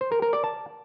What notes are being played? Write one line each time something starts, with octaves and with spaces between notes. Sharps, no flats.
C5
A#4
A#4
D5
A5